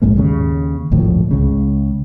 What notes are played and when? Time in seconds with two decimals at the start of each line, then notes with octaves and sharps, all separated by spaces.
0.02 A#1 G#2 G#3 A#3
0.17 D#2 C#3
0.92 G#1 D2 A2 F3
1.31 C#2 C#3